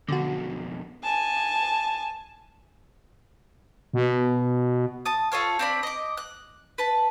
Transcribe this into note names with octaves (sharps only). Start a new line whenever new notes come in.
F2 B2 D3 F#3 F#4
G#5 A5
B2
A5 D#6
F4 A4 C#5 F5
C4 D4 B5
D#5 D6
F#6
B4 A5